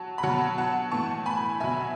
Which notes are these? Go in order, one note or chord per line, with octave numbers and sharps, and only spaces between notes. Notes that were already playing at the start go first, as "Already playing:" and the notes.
Already playing: F#3 A5
B5
B2 F#3 F#5 A5
F#5 A5
A2 E3 A5 C#6
G#5 B5
B2 F#3 E5 G#5